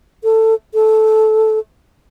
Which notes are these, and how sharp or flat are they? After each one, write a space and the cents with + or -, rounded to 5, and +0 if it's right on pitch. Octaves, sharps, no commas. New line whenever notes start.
A4 +15
A4 -10